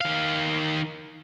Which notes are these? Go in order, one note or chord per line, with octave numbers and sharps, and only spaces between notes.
D#3 F5